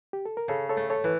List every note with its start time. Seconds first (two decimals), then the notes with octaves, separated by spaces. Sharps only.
0.13 G4
0.26 A4
0.37 A#4
0.48 C#3 A4 C#5
0.69 A4 C#5
0.77 A3
0.90 A4 C#5
1.04 E3